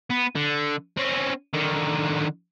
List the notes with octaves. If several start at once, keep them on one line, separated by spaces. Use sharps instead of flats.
B3
D3
C4 C#4
D3 D#3